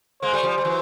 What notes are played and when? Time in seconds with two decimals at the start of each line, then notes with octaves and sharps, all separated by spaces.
0.22 G#3 A#3 C5
0.33 G3 A3
0.43 F3 G3
0.58 G3
0.65 E3 F#3